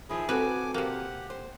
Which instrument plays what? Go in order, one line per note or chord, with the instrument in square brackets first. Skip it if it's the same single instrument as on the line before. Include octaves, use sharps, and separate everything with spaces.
[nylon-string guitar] D#3 F3 [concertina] E4 G#4
[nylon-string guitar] C4 F#4 A4 [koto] B4 [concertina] G#5 D6
[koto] C3 A#3 [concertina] G4 F#5
[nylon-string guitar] C5